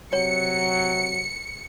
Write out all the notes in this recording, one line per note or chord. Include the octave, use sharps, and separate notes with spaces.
C3 F#3 C#5 C#7